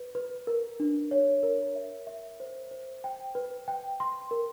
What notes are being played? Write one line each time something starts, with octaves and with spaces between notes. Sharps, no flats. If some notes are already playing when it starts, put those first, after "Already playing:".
Already playing: B4
B4
A#4
D4
C#5
A#4
E5
E5
C5
C5
G5
B4
G5
C6
A#4